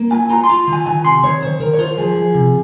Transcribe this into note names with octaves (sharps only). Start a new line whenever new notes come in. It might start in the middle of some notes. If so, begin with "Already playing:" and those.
Already playing: A#3
F4 G#5
F4 A#5
C6
F4
D#3
G#5
D#3 G#5
C3 C6
D#3 C#5
D#3 C5
D#3 A#4
C#5
F4 C5
F3 G#4
F3
C3